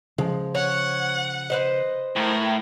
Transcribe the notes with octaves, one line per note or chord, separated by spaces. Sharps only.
C#3 F3 G#3
C#5 F#5
B4 C5 D#5
A2 A#4